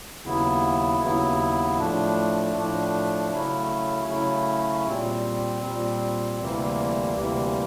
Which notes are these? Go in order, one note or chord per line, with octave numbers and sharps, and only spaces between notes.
D#2 C#3 F#3 B3 E4
D#2 C#3 F#3 B3 E4
A2 F3 A3 D4
A2 F3 A3 D4
C#3 F#3 A3 C#4 E4
C#3 F#3 A3 C#4 E4
A#2 G3 C4
A#2 G3 C4
D2 C3 E3 G3 A#3
D2 C3 E3 G3 A#3